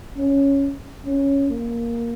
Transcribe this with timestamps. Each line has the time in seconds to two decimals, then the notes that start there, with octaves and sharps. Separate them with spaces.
0.17 C#4
1.06 C#4
1.50 A#3